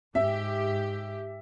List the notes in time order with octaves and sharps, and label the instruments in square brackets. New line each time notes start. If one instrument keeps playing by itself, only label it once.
[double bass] G#2 [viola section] G4 [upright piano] E5